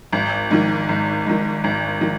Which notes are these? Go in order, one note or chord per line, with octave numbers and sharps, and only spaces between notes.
G#1
G#2 D#3
G#1
G#2 D#3
G#1
D#3